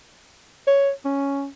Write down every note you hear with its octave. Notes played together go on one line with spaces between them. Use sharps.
C#5
C#4